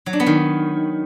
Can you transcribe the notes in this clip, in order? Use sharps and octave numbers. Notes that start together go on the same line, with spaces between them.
F#3
D4
B3
D#3